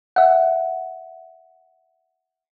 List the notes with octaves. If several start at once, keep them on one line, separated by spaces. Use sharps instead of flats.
E5 F#5